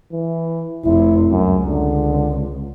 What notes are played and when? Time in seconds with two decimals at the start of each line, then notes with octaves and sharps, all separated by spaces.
0.13 E3
0.85 F1 C3 E4
1.31 C#2 F#2
1.68 D3